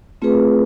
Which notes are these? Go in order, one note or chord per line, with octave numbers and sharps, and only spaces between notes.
A3 C4 F4 G#4 B4